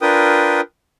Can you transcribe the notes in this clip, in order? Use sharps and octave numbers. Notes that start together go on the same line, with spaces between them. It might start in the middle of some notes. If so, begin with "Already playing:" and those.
D4 F4 A#4 B4 G5 D#6